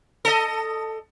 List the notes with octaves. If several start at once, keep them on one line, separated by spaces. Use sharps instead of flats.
A4 D#5